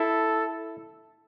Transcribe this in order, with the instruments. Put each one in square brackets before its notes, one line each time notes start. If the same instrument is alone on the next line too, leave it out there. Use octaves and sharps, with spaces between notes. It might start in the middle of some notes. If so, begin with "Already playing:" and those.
Already playing: [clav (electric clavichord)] E4 [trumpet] A4